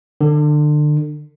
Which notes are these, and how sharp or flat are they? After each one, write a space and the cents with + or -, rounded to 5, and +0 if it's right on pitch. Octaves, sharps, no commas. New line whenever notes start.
D3 +30